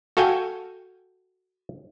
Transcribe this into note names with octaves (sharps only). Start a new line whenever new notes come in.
F#4 A4 F5 G5 G#5